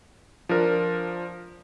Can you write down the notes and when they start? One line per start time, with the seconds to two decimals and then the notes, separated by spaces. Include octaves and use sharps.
0.49 F3 D4 A#4